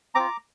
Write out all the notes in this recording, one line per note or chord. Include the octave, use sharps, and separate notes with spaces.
C4 F4 A#5 D6